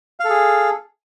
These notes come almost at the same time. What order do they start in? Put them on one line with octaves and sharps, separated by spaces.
F5 A4 G#4